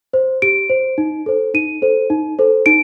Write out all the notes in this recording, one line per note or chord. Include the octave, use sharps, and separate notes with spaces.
C5
G4 D7
C5
D#4
A4 C5
D#4 D#7
A4 C5
D#4
A4 C5
D#4 D7